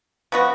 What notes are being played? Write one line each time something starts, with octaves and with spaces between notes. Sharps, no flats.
F3 B3 F#4